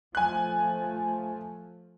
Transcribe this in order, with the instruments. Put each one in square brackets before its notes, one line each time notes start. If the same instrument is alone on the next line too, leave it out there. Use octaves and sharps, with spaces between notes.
[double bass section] F3 A3 [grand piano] G#5 F#6